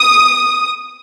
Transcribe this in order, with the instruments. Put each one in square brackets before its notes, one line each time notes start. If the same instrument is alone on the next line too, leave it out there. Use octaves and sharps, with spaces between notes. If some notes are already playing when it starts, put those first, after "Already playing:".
Already playing: [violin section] D#6